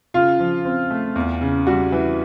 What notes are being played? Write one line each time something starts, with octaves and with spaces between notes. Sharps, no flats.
C#3 F4
F3
C4
A3
E2
C#3
G3 F#4
E3